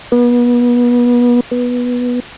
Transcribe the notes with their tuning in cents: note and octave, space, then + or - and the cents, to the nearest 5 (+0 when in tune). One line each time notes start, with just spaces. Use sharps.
B3 -30
B3 -10